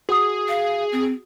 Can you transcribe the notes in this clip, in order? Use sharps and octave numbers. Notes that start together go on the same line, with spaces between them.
F#4 G#4 F#5 D#6
F5
C4